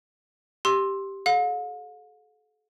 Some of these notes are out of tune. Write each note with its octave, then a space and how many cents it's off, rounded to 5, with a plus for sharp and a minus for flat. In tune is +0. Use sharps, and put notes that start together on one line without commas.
G4 +0 C6 +10 E6 +0
A4 -40 F5 +45